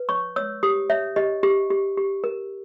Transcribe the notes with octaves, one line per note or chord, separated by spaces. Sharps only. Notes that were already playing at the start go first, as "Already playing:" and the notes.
Already playing: B4
C#5 C#6
C#5 E6
G4 D#6
C#5 E5
G4 D#5
G4
G4
G4
A#4